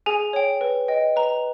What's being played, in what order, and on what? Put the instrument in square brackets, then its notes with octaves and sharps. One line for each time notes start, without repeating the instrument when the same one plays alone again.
[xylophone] G#4 G#5
C#5 G5
B4
D#5 G5
B4 A#5